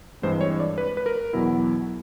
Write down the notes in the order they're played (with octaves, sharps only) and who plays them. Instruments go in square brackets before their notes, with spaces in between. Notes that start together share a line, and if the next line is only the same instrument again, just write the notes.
[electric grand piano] G2 E3 G#3 C4 C5
C#5
D5
B4
B4
A#4
E2 B2 F#3 B3 E4